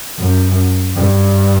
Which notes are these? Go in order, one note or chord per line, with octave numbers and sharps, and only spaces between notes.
F#2
G2